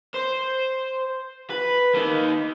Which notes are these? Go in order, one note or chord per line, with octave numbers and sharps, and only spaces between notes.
C5
B4
A#3 D#4